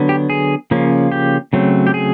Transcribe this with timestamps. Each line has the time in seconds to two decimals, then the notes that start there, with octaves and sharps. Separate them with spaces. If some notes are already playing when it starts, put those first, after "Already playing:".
Already playing: D3 F#3 B3
0.09 G4
0.30 G#4
0.71 C#3 F3 A#3 C#4
1.12 G4
1.53 C#3 F#3 A3 C4
1.87 G4
1.94 G#4